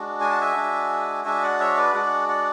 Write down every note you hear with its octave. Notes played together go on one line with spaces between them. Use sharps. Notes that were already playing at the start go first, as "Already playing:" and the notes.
Already playing: G#3 D4 F#4
G#5
A5
E5 G#5
G#3 D4 F#4
G#3 D4 F#4 E5 G#5
D5 F#5
C#5 E5
B4 D5
G#3 D4 F#4 D5 F#5
D5 F#5